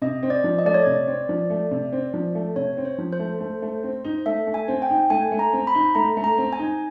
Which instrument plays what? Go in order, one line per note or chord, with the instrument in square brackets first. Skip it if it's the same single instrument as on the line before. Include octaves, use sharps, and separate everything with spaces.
[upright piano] C3 [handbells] D#5
[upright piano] C4
[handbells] D5
[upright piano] F3
[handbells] D#5
[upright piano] A3 [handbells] D5
[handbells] C#5
[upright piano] C3 [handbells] D5
[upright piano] C4
F3
A3
C3
C4
F3
A3
[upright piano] C3 [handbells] C#5
[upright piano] C4
[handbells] C5
[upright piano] F3
[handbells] C5
[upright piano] A3
A3
A3
C4
D#4
[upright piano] A3 [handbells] E5
[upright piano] A3
[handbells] G#5
[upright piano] C4
[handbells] G5
[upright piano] D#4
[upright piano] A3 [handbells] G#5
[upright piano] A3
[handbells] A#5
[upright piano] C4
[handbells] B5
[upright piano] D#4
[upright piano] A3 [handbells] A#5
[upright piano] A3
[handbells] A#5
[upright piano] C4
[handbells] G#5
[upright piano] D#4